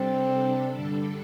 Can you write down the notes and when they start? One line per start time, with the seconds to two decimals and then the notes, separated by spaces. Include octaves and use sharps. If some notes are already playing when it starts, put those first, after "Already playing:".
Already playing: C3 G3 C4 D4 A4
0.74 G2 D3 G3 D4 A4